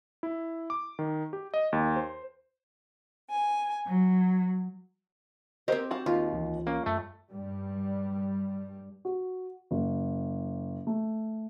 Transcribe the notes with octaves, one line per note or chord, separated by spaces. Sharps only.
E4
D6
D#3
G4
D#5
D#2
C5
G#5
F#3
C4 G4 A#4 C5 D#5
F#4 F5 A5
D#2 F4
C#2 E3
A#3 C#4
F#2 A3
G2 G3
F#4
F#1
A3